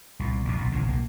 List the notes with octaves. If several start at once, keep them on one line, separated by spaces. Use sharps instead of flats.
C2 A#2
A#1 F2 B2
B1 A#2
G#1 C#2 A#2 C#3
B1 C3 A#3